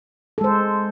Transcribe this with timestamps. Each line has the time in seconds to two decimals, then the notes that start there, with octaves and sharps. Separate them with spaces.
0.38 A4
0.41 G#3
0.44 C5